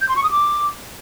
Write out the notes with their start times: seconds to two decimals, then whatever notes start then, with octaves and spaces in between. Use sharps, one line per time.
0.01 G6
0.09 C6
0.16 C#6
0.24 D#6
0.31 D6